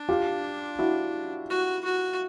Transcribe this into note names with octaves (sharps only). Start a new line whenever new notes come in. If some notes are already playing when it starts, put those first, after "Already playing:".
Already playing: D4
F4 G4
E4 F#4
F#4
F#4